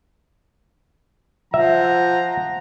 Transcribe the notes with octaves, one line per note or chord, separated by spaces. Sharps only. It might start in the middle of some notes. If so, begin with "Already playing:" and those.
F3 E5 F#5 A#5